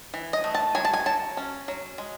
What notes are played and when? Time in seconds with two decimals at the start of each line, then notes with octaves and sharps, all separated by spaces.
0.14 E3
0.33 D#5
0.44 A3
0.55 A5
0.75 F#3 G#5
0.85 A5
0.94 G#5
1.06 F#3 A5
1.37 C#4
1.68 F#3
1.98 G#3